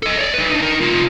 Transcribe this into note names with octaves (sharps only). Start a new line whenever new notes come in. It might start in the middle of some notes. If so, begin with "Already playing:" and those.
A4 D#5
C#5 D5
D#4 B4
D4 D#4
D#4 A#4
C3 F4